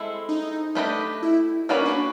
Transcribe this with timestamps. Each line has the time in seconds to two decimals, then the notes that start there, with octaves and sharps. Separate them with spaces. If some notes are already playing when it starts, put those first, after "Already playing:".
Already playing: G#3 C4 E4 A4
0.29 D#4
0.75 A3 D4 G4 B4 D#5
1.23 E4
1.69 A#3 C#4 D#4 F#4 B4 D5
1.86 D4